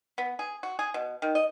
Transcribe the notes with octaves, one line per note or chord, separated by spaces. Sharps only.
B3
G#4
F#4
G#4
B2
D#3
D#5